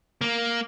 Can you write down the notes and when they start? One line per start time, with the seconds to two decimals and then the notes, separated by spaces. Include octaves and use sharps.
0.21 A#3